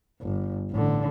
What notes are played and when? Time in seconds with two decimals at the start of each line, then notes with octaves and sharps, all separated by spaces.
0.22 G1
0.71 A1 D3